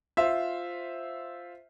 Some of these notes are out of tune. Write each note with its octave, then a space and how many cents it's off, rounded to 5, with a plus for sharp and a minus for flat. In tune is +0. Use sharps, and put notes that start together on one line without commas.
F4 +0 C5 +0 E5 -5